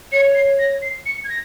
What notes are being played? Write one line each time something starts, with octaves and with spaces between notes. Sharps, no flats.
C#5 C#7
C7
A#6
C7
C#7
G#6
A#6